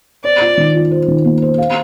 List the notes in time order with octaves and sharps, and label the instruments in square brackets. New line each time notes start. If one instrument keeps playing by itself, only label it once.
[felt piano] C5 [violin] D5
[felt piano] F4
D#3
F4
C5
D#3
A#3
C5
F5